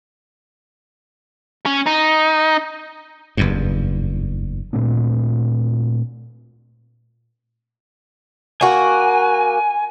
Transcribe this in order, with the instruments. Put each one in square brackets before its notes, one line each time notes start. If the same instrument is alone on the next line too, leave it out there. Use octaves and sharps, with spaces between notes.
[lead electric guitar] C#4
D#4
[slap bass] F#1 E2 G2
[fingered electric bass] A#2 A3 C4 D4
[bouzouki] A#3 F#4 [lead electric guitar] G#5